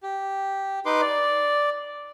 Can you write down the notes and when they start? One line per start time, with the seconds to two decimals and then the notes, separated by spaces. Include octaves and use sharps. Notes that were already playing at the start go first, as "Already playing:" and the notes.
0.03 G4
0.86 D#4 B4 C6 D6
1.01 D5